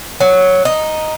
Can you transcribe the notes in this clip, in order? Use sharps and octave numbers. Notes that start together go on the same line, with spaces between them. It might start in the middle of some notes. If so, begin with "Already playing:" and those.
F#3
D#4